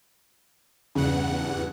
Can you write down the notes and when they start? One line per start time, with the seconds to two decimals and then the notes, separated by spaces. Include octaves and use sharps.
0.95 E2 G2 C#3 F#5